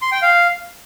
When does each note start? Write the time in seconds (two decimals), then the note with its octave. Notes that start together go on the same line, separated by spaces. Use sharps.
0.02 C6
0.12 G5
0.22 F5